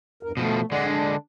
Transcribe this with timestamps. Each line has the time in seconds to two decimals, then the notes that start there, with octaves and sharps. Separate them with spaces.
0.23 E2 G2 A#4
0.37 B2 F3 A3
0.72 D3 G#3 D5 F#5
0.85 D4